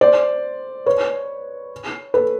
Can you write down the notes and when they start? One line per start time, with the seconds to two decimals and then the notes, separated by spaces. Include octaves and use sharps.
0.01 C5 D5
0.86 B4 C#5
2.14 A4 B4